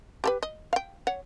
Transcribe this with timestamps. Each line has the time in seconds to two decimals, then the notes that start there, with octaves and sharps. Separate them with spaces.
0.24 G4 A4 B4
0.43 D#5
0.73 F5 G5
1.07 C#5 F#5